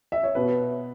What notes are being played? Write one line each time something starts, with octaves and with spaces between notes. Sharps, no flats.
E5
C#5
B2 B4